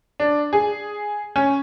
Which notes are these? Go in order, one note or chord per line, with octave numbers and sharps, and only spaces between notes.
D4
G#4
C#4